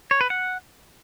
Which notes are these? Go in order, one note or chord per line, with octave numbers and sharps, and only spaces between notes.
C#5
B4
F#5